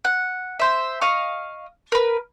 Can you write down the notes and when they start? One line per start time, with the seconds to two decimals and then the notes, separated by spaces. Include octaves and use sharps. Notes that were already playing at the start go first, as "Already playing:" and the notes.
0.05 F#5
0.60 C5 E5
1.02 D#5 F5 C#6
1.92 A#4 B4